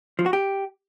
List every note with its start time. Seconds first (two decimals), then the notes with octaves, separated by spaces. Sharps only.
0.19 F3
0.26 F#4
0.33 G4